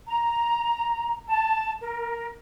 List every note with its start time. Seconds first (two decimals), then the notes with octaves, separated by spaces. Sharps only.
0.07 A#5
1.29 A5
1.81 A#4